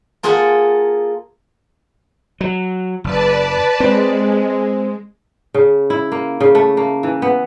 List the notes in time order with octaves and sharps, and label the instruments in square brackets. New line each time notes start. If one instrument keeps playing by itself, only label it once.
[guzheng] A#3 F4 G#4 A4 F#5
[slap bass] F#3
[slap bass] F#1 [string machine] B4 D5 A5
[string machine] G#3 [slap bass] C4
[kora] C#3
E4
A#3
C#3
A3
A#3
E3
B3